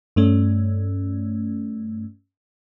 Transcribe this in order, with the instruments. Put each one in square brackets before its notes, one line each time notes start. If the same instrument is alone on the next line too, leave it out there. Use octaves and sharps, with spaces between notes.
[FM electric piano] G2 A3 C#4